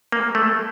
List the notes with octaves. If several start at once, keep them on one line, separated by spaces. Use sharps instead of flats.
A#3
A3